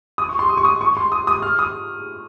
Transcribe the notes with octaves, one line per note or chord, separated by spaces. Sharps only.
D#6
C#6
C6
D#6
C#6
D#6
C#6
C6
D#6
D#6
F6
D#6